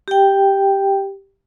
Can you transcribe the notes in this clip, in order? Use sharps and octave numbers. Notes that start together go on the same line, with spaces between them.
G4 G5